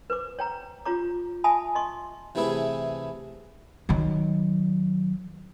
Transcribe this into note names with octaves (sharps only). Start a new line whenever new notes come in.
B4 C5 D6
C#5 G5 A#5
F4 G4 C#5 A#5 D6
E5 G#5 A5 B5 D#6
D#5 C6 C#6
C3 E3 A3 E4 G#4 B4
D#3 F#3